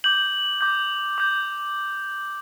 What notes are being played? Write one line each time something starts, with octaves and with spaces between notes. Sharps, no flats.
D6 G6 F#7
D6 G6
D6 G6